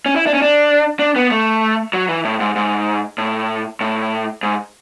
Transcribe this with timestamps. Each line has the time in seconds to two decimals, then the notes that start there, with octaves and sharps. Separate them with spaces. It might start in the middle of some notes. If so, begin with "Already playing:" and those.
0.06 C#4
0.16 E4
0.27 D4
0.34 C#4
0.42 D4
0.99 D4
1.16 B3
1.31 A3
1.93 F#3
2.09 E3
2.25 A2
2.40 G#2
2.56 G#2
3.18 A2
3.81 A2
4.43 G#2